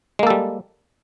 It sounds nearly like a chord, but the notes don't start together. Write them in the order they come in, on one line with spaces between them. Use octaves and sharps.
G#3 A#3 A4 G3